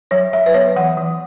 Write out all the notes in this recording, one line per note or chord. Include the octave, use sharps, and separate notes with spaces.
F#3 C#5
F#3 E5
B4
B3 C#5
E3 F#5
E3